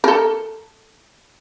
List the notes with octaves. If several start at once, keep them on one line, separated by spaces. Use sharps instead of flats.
A4 A#4